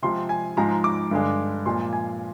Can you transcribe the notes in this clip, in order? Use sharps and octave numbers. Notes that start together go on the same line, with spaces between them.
C3 F3 G#3 C6
G#5
G#2 F3 G#3 A#5
D6
G2 D3 G#3
A#2 F3 G#3 C6
G#5